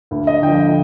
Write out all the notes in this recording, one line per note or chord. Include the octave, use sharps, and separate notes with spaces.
D2
D#5
D3 G5
F3